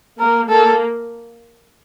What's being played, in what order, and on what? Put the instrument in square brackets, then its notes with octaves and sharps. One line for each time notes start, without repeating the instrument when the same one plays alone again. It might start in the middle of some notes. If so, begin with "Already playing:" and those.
[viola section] A#3 [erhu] A#4
[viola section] A#3 [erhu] A4